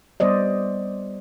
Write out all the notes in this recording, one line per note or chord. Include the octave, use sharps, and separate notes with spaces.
G3 B3 C5 D5 D#5